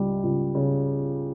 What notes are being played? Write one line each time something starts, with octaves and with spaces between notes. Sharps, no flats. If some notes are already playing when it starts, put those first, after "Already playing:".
Already playing: C#2 G3
C#2
C#3